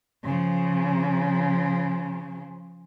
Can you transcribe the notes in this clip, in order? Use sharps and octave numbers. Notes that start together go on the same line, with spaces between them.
C#3 F3